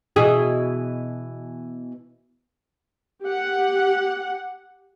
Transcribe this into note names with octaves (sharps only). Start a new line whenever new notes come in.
B2 E3 G#4
G4 F#5